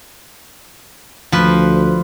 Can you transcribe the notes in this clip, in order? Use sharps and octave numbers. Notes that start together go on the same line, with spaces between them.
D2 F3 B4